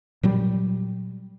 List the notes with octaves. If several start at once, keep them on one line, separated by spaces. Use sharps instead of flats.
A#2 F#3 G3